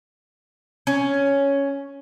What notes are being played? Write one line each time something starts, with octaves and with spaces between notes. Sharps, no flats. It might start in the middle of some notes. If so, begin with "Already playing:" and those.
C#4